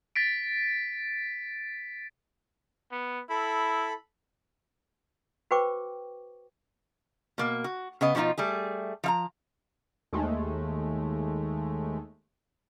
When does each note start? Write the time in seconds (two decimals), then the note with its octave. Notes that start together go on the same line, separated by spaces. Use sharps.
0.16 A6 B6 D7
2.92 B3
3.30 E4 A4 B5
5.51 F#4 B4 C5 G5 C#6 D6
7.38 B2 A#3
7.64 F#4
8.01 C#3 B3 D#5
8.15 B2 F3 C#4 D#4 F4
8.38 G3 A3 G#4
9.04 F3 F5 A#5
10.13 D#2 G#3 A3